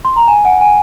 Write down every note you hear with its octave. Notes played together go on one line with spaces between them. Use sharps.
C6
A#5
G#5
F#5
G#5